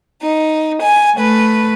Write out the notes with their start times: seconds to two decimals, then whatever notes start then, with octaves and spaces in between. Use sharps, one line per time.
0.21 D#4
0.81 G#5
1.16 A3 B4